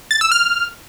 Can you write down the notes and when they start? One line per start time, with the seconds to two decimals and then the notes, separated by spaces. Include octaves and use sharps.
0.11 A6
0.21 E6
0.32 F6